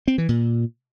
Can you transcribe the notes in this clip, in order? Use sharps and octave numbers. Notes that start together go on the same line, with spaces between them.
C4
E3
A#2